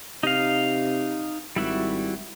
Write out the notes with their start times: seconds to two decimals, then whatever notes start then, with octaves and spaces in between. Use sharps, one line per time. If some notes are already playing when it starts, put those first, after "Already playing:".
0.23 C3 D#4 F5
1.56 G#1 G3 E4 F#4